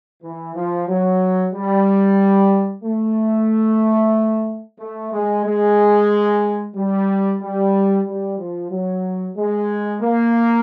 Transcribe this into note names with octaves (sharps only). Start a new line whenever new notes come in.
E3
F3
F#3
G3
A3
A3
G#3
G#3
G3
G3
G3
F3
F#3
G#3
A#3